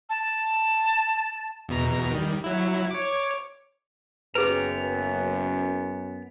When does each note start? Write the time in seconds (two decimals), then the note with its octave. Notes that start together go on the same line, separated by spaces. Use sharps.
0.09 A5
1.69 E2 B2 A#5
2.10 D#3 G3
2.44 F#3 E4
2.91 C#5 D6
4.35 F#1 F#2 B3 G#4 B4 G5 A#5